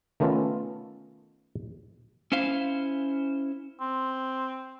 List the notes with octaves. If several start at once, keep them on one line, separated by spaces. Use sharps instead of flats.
D#3 A3 B3 C#4 F4 A4
C#4 E4 C5 F5
C4